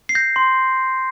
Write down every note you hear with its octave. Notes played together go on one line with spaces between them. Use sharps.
C7
G6 A#6
C6